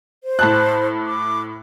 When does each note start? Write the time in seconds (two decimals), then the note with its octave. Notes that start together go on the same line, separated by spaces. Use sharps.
0.24 C5
0.39 A2 A5 F#6
1.07 D6